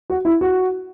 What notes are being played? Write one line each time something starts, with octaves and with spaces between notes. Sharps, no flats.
F#4
E4
F#4